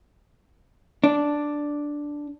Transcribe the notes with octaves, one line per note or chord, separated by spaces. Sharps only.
D4